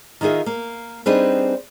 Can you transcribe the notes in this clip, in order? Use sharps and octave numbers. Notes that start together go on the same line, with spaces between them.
D#3 D#4 F4 G#4 E5
A#3
G3 C4 D4 D#4 G#4 B4